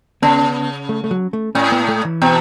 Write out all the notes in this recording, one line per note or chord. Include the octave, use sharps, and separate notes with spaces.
C#3 B3
A3
A3
F#3
A3
A2 C#4
B3
A3
E3
B2